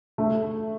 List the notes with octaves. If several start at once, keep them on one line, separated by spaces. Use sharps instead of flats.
A3